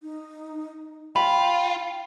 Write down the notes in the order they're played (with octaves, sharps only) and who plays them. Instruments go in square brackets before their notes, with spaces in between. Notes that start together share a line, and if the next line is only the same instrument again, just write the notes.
[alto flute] D#4
[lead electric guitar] F4 [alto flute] G5 [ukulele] B5